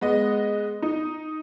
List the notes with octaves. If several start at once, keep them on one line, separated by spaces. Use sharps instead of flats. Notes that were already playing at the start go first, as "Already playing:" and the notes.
G#3 B3 D#5
D#4